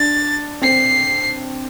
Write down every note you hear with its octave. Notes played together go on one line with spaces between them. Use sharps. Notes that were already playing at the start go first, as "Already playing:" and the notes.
Already playing: D4 A6
C4 C7